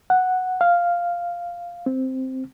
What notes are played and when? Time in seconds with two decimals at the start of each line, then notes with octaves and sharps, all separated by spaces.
0.10 F#5
0.61 F5
1.86 C4